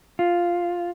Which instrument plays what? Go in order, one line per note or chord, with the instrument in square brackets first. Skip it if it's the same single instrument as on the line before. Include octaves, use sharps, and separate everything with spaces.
[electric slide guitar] F4